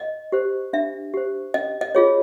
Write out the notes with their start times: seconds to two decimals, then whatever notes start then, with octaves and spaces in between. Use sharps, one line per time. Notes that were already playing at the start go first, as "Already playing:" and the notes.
Already playing: D#5
0.32 G4 C5
0.73 D4 E5
1.14 G4 C5
1.54 C#4 D#5
1.81 D#5
1.95 F4 G#4 C#5